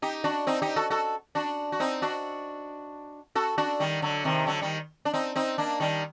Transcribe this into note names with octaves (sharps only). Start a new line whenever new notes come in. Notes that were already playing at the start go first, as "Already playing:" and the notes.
D#4 G4
D4 F#4
C4 D#4
D#4 G4
F#4 A4
F#4 A4
D4 F#4
F#4
C4 D#4
D4 F#4
F#4 A4
D4 F#4
D#3 G3
D3 F#3
C3 D#3
D3 F#3
D#3 G3
D4
C4 D#4
C4 D#4
A#3 D4
D#3 G3